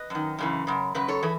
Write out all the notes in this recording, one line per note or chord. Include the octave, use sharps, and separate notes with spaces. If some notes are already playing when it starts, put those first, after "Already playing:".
Already playing: B4 D#5
F#2 D#3
F#2 C#3 E3
F#2 C#3
F#2 C#3 B4
A4 C#5
E3 G#4 B4